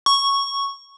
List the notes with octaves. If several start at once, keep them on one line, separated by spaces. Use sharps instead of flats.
C#6